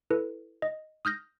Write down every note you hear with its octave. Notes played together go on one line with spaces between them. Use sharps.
E4 A4 B4
D#5
D#6 F6 G6 A#6